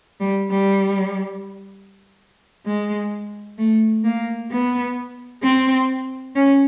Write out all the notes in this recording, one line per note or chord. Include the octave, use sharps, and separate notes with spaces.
G3
G3
G#3
A3
A#3
B3
C4
C#4